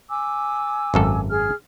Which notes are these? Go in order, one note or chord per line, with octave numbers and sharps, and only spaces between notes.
G#5 D6 E6
G#1 F#2 A4
G#4 F6